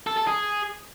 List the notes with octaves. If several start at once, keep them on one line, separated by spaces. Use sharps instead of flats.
A4
A4
G#4